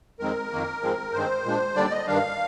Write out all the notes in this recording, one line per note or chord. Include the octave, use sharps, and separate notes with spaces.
F2 D#3 G#3 C4 A#4
F2 D#3 A#3
G#2 F3 G#3 C4
G2 D#3 G#3 C4 C5
A#2 G#3 D4
D#2 D3 G3 D4 D5
D#5
G2 D#3 G3 D4 F5